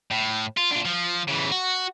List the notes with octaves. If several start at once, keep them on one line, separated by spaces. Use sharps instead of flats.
A2
F4
D4 F4
F3
C#3 E3
F#4